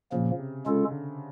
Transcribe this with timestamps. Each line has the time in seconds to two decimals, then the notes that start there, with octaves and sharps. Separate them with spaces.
0.12 A#2 C#3 F3 A#3
0.39 C3
0.66 C#3 G#3 C#4 F4 A4
0.92 D3